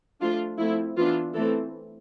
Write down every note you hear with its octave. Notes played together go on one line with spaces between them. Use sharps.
F3 A3 D4 F4
F3 A3 C4 E4
E3 B3 D4 F4
E3 A3 C4 A4